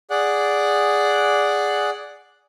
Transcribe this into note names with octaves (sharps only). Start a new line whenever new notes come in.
G#4 D5 F#5